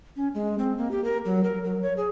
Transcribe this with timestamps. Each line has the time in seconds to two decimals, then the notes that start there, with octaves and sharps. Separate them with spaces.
0.16 C#4
0.35 G#3
0.59 C4
0.78 A#3
0.91 G4
1.04 A#4
1.25 F#3
1.44 A#4
1.64 F#3
1.82 C#5
1.97 G#4